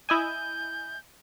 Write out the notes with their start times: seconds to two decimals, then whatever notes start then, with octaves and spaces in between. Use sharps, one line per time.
0.09 E4 D#5 G#5 G6